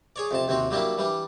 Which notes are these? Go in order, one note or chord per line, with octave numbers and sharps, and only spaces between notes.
G#4 C#5 D5
F2 C3 A5
D#2 C3 C4 F#4
F#3 G3 A#3 D4 E4
E3 G3 D4